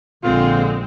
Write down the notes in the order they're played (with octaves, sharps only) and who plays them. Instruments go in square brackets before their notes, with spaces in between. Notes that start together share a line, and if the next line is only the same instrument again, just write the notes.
[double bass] A#1 [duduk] D3 [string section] G#3 C4 [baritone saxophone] F4